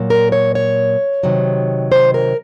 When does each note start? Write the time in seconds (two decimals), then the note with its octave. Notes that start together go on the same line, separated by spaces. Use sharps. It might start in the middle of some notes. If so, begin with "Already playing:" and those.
Already playing: A#2 F#3
0.10 A#4
0.32 C#5
0.55 C#5
1.23 C3 D#3 F#3
1.92 C5
2.14 A#4